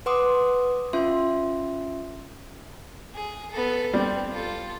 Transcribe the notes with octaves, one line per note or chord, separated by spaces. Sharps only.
B4 F#5 C6 D6 D#6
C#4 F4 E5 C6
G#4
B3 A4
G3 C4
F4 A4